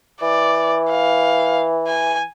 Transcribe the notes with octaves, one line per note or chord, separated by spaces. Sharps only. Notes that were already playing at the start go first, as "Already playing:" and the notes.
E3 D5
F5
G#5